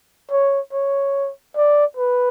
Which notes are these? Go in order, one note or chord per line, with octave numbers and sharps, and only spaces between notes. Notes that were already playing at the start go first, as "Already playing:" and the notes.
C#5
C#5
D5
B4